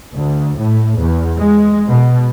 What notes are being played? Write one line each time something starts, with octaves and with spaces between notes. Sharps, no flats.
D2
A2
E2
G#3
B2